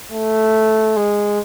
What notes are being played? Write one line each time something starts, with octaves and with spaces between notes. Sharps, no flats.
A3
G#3